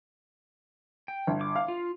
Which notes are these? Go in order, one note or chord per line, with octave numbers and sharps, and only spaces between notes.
G5
G1
D6
F5
F4